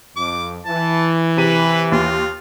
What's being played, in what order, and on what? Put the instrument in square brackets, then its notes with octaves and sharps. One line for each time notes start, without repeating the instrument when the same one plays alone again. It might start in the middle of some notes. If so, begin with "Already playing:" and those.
[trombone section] F2 [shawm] D6
[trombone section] E3 [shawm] A5
[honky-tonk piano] C3 D#7 [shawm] B4
[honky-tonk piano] D#2 [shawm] F4